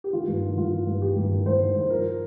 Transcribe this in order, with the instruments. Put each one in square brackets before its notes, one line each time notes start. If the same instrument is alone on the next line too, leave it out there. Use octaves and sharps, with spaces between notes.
[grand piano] G4
D#3 F4
G2
D#3
G2 F4
D#3
G2
D#3 G4
G2
D#3
G2 C5
D#3
G2 C5
F3 A#4